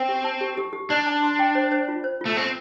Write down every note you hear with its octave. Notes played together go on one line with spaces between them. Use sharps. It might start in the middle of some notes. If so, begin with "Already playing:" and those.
Already playing: C4
G4
A5
G4
G4
G4
D4 D5
A5
C6
G5
C5
C5
F4
C5
A3 F4
C4 C5